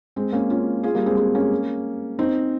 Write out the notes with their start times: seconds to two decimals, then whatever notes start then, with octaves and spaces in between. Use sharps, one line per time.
0.16 G#3 C4
0.33 A#3 C#4
0.50 C#4 F4
0.83 F4 G#4
0.95 G3 A#3
1.06 G#3 C4
1.17 G#3 C4
1.35 A#3 C#4
2.19 C4 D#4